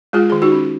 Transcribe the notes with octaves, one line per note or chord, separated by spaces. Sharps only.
G#3 F4 G#4
D#3 G#4
D#4 F#4
C#4